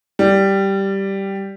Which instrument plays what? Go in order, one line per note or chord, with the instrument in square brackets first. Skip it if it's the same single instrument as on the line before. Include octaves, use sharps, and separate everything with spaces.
[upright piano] G3